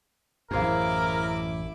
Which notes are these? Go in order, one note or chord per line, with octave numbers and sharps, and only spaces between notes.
A1 F#2 E4 G#4 A#4 C5 F5 D6